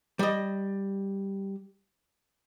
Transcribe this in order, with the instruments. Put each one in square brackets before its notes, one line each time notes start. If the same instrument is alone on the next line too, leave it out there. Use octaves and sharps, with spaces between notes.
[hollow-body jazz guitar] G3 D#5